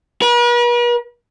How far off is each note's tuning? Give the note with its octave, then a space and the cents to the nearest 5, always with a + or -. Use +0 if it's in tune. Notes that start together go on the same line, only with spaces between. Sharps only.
B4 -45